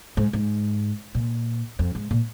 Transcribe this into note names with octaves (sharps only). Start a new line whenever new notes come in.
G#2
G#2
A#2
F2
G#2
A#2